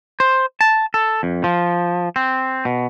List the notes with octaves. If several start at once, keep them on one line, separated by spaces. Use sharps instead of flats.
C5
A5
A4
F2
F3
C4
B2